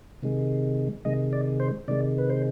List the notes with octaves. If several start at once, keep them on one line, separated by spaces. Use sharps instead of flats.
C3 D#3 G#3
C3 D#3 G#3 D#5
D5
C5
C3 D#3 G#3 D5
B4
C5